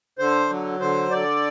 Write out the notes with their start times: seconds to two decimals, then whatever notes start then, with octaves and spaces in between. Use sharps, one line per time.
0.19 D3 C5
0.50 F#3
0.80 D3 C5
1.11 D3 D5